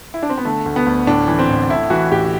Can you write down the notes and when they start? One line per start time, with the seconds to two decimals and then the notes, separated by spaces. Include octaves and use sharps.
0.14 E4
0.23 D4
0.30 C4
0.38 B3
0.45 D3 A3
0.66 D2
0.76 B3
0.86 D2
1.07 A2 D4
1.28 E3
1.39 C4
1.49 A1
1.70 A2 E4
1.90 E3 F#4
2.11 A1 G4